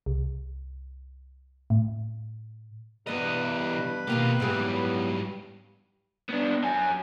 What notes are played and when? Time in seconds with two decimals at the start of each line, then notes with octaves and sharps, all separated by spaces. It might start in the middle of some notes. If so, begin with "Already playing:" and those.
0.06 C2
1.70 A2
3.07 G2 E3 G3 B3 B4 D#5
4.07 B2 D#3 A#3 F4 G4
4.40 G#2 E3 F#3 G3 B3 G#4
6.30 B3 D4
6.64 F#2 G#5